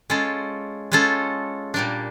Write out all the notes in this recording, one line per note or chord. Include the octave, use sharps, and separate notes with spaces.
G#3 C#4 F4 A4
G#3 C#4 F4 A4
A#2 G3 A#3 D4